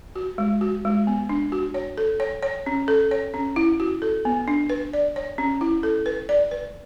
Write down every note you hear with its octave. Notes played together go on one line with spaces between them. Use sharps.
F#4
G#3
F#4
G#3
B3
D4
F#4
C#5
A4
C#5
C#5
C#4
A4
C#5
C#4
E4
F#4
A4
B3
D4
B4
D5
C#5
C#4
E4
A4
B4
D5
B4